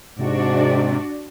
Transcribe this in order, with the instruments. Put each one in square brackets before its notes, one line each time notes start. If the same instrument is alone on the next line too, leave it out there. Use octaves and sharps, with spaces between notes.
[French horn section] G#2 [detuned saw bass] C3 [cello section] D4 F#4 D5